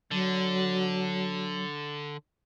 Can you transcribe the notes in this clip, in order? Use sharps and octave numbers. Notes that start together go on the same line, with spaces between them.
D3 F#3